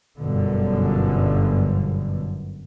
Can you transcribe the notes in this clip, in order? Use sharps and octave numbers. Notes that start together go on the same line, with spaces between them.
G1 F#2 B2 D3